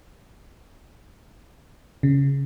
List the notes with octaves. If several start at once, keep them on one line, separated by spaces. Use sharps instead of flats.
C#3